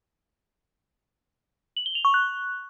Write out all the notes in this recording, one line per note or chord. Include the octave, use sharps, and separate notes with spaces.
F#7
G7
F7
C#6
F#6